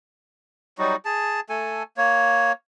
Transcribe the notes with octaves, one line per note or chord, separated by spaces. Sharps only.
F#3 G3 D#4 F#4
G#4 A5
A3 A4 G#5
A#3 C#5